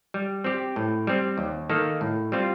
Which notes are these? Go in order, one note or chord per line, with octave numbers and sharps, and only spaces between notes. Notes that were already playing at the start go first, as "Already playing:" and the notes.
G3
C4 G4
A2
G3 C4
D#2
D#3 A#3 D#4 A4
A2
G3 C4 F4